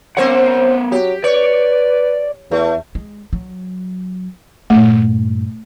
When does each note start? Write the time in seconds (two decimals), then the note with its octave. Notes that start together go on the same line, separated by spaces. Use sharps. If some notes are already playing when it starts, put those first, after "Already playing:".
0.17 B3 C4 A#4 C5 C#5 F#5
0.92 F#3 G4
1.24 B4 C#5 D5
2.51 E2 A3
2.95 G#3
3.33 F#3
4.70 G2 A#2 A3